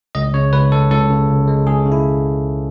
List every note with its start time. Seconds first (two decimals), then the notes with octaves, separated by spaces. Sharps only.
0.15 C#2 D#5
0.34 C#3 C#5
0.53 C#2 B4
0.72 G#3 A4
0.91 C#2 A4
1.10 C#3
1.29 C#2
1.48 G#3
1.67 C#2 G#4
1.85 C#3
1.92 E4